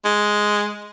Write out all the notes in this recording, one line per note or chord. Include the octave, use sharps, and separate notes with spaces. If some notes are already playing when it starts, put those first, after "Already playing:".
G#3